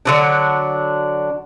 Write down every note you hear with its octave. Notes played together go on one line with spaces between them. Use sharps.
D3 F#3 D4